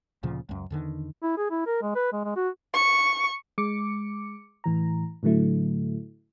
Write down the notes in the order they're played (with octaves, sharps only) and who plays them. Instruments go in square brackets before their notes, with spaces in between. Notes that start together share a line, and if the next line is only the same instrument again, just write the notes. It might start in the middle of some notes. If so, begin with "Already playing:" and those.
[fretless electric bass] D2 A#2 C#3 F3
C#2 F#2
E2 D3 D#3
[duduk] E4
G#4
E4
A#4
G#3
B4
G#3
G#3
F#4
[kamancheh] C#6
[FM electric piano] G#3 D6 C#7
A2 E3 A#5
A2 D3 F#3 A3 E4